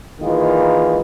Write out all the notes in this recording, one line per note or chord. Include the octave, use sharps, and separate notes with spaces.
D#3 E3 G#3 A#3 D#4 F4